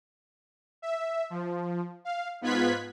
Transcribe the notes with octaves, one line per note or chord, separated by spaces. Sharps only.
E5
F3
F5
G#2 B3 F4 F#6 G#6 B6